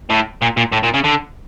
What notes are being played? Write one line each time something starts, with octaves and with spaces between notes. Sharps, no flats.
A2
A#2
A#2
A2
A#2
C#3
D3